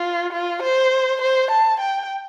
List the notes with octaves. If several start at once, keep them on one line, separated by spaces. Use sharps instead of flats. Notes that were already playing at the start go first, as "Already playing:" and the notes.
Already playing: F4
F4
C5
C5
A5
G5